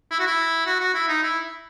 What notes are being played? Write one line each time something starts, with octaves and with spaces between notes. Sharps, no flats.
E4
F#4
E4
F#4
F#4
E4
D#4
E4